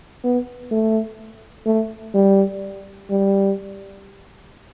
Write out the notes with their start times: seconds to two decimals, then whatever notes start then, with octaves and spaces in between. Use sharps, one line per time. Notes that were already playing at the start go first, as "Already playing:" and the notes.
0.24 B3
0.71 A3
1.66 A3
2.14 G3
3.10 G3